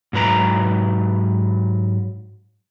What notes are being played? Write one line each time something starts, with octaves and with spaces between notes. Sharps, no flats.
G#2 F#3 B4 A#5